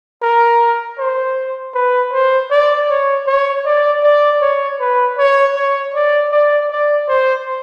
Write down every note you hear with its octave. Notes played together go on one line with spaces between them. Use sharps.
A#4
C5
B4
C5
D5
C#5
C#5
D5
D5
C#5
B4
C#5
C#5
D5
D5
D5
C5